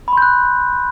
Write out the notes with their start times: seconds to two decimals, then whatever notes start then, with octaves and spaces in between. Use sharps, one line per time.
0.08 B5
0.13 C6
0.17 G6
0.22 F#6